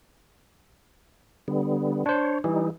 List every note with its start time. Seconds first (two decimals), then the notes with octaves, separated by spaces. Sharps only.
1.48 D3 G3 B3
2.06 D4 C5 C#5
2.44 E3 G3 D#4